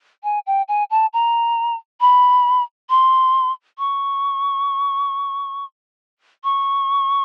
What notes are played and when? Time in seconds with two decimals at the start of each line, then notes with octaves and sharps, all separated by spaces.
0.24 G#5
0.47 G5
0.68 G#5
0.91 A5
1.13 A#5
2.01 B5
2.90 C6
3.79 C#6
6.44 C#6